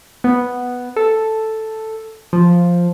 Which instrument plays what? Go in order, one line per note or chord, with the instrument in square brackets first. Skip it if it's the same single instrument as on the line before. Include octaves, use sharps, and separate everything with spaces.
[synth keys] B3
A4
F3